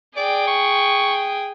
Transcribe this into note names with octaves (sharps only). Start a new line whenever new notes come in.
G#4 D5 G5
C#6